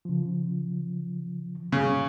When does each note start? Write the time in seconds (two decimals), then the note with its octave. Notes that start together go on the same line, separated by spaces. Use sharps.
0.05 C#3 F3
1.72 C#3